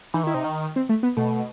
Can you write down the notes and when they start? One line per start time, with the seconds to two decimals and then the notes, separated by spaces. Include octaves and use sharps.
0.14 E3 D#4
0.23 D#3 E4
0.34 C3 D#4
0.44 D#3
0.76 C4
0.89 A3
1.03 B3
1.17 B2 A3